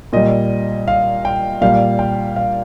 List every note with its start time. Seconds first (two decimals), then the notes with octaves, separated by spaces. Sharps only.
0.13 A#2 G3 D#5
0.88 F5
1.25 G5
1.61 A#2 G3 F5
1.99 G5
2.36 F5